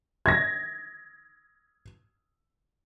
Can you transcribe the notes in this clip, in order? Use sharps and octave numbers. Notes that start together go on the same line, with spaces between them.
G#6 A#6